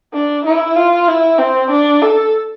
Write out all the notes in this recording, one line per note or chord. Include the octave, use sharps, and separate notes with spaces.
D4
E4
F4
E4
C4
D4
A4